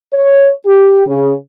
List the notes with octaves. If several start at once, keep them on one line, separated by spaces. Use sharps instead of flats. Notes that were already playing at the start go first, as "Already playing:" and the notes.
C#5
G4
C#3